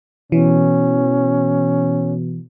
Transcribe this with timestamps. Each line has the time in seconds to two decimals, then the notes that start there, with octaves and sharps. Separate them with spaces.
0.32 B2 E3 C#4